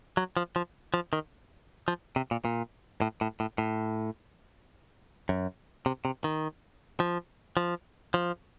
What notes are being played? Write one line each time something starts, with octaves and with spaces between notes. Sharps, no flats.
F#3
F3
F3
F3
D#3
F3
C3
A#2
A#2
A2
A2
A2
A2
F#2
C3
C3
D#3
F3
F3
F3